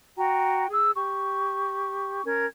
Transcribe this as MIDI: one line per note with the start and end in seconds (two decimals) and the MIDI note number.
0.17 0.67 66
0.17 0.67 79
0.17 0.67 82
0.71 0.92 68
0.71 0.92 88
0.96 2.24 67
0.96 2.24 85
2.26 2.45 61
2.26 2.45 70
2.26 2.45 92